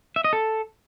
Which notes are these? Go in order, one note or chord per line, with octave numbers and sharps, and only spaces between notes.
E5
D#5
A4